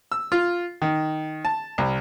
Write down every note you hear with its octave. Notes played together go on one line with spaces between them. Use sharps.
E6
F4
D#3
A5
C2